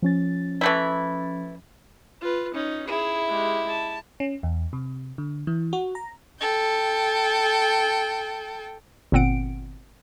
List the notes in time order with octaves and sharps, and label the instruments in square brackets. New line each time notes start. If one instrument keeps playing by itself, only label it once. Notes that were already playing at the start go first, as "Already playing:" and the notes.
[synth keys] F3 C#4 A6
[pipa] E3 A3 E4
[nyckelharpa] F4 B4
C#4 D#4
[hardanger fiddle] E4 [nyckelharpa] G#4
[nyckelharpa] G#3 G4
A5
[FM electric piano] C#4
E2
C3
D3
E3
F#4
A#5
[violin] A4 G5
[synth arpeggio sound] G1 A#2 C4 F#5 D7